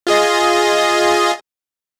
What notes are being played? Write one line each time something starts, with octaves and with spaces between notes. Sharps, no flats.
F4 G#4 D#5